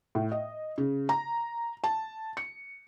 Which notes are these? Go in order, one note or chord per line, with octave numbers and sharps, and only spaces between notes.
A2
D#5
C#3
A#5
A5
C#7